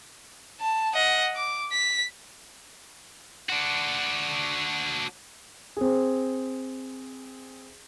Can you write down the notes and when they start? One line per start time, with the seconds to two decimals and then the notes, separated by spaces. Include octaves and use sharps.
0.61 A5
0.95 D#5 F#5
1.36 D6
1.72 B6
3.49 D4 F#4
5.77 C4 G#4